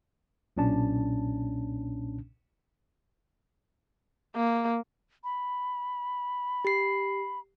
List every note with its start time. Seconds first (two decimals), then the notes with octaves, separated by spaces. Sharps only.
0.57 B1 A#2 C#4 D4 A5
4.35 A#3
5.24 B5
6.65 G4 C7